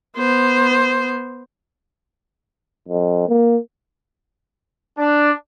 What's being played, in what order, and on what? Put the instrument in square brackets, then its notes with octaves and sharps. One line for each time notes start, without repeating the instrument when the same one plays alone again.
[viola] B3 C5
[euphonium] F2
A#3
[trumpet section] D4